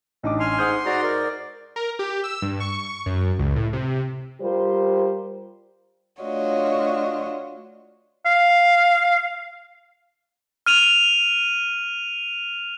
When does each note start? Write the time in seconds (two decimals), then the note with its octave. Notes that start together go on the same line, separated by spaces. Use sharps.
0.24 A1 D4 D#4 D6
0.40 G#5 C6 F6
0.59 G#2 F#5 D#6 G6
0.86 G#2 F#4 D5 A#5
1.03 A#4 D5
1.76 A#4
1.99 G4
2.24 E6
2.42 G2
2.60 C#6
3.06 F#2
3.39 C#2
3.56 A2
3.73 C3
4.41 G3 F4 G4 A#4 C5
6.21 A3 D4 F4 F#4 C#5 D#5
8.26 F5
10.66 F6 D#7 F7